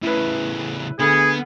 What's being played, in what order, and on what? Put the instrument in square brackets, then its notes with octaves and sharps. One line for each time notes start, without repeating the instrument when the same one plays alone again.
[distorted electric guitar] A2 C#3 [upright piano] E4 B4
[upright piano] D2 [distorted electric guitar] B3 [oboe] G#4